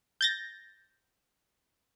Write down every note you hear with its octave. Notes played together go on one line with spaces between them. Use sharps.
G6 A6 A#6